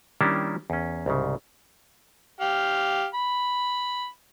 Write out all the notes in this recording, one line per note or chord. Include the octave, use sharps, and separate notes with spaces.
D#3 G3 A#3 C#4 D4 E4
E2 C#4
C2 G#2 C#3
G4 F5
B5